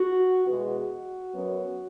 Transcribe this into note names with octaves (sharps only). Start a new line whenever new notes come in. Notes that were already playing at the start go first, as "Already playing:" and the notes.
Already playing: F#4
E2 B2 G#3 B3 F#4
F#2 F#3 B3